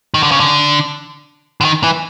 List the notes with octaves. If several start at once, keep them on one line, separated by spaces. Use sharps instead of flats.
D#3
D3
C#3
D3
D3
D#3
E3